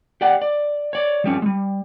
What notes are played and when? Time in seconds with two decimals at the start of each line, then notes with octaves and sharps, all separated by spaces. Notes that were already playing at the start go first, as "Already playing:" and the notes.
0.21 G4 D5 F#5
0.42 D5
0.93 C#5 D5
1.24 F3 G3 C#4
1.42 G3 G#3